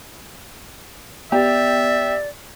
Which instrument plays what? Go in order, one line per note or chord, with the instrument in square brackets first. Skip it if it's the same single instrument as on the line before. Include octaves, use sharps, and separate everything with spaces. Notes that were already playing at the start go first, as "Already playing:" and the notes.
[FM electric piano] B3 [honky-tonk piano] G4 [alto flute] D5 [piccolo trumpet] E5